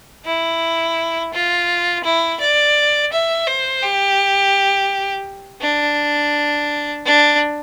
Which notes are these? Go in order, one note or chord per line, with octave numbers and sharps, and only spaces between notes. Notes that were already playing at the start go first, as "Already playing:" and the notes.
E4
F4
E4
D5
E5
C5
G4
D4
D4